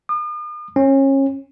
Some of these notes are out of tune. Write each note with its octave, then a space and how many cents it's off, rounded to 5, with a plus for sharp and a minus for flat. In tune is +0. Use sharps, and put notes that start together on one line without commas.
D#6 -45
C#4 -30